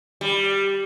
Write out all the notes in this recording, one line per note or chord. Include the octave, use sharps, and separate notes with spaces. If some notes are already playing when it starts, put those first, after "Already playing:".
G3